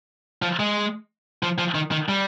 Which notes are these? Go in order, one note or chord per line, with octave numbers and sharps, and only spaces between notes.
F3
G#3
F3
F3
D#3
D#3
G3